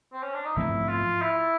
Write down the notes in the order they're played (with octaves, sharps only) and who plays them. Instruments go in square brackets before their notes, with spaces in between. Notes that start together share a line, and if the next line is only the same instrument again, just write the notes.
[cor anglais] C4
C#4
D4
D#4
[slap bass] G#2 F3 A3 C4 [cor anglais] E4
[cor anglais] F4
E4